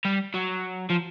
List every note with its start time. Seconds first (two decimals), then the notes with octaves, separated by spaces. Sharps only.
0.05 G3
0.34 F#3
0.90 F3